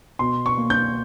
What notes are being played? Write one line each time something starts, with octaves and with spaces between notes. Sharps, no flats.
B2 C6
C#6
A#3
G6